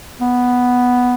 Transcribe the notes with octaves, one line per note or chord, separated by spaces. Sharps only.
B3